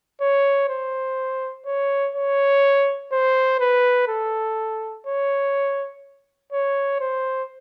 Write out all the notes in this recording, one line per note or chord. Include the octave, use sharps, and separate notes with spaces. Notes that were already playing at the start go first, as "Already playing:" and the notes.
C#5
C5
C#5
C#5
C5
B4
A4
C#5
C#5
C5